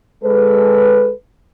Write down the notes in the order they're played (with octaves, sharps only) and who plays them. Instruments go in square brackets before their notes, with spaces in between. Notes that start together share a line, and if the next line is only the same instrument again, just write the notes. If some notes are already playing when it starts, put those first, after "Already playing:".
[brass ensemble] G#3 A4 B4